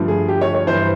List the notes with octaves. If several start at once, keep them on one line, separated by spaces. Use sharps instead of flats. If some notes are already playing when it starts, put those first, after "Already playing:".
Already playing: G2 D3 F3 A3
G#4
G4
C#5
C#5
G2 E3 C5